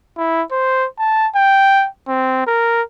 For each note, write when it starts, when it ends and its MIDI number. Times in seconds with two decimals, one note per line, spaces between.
0.17 0.43 64
0.52 0.87 72
0.99 1.27 81
1.36 1.87 79
2.08 2.45 60
2.47 2.82 70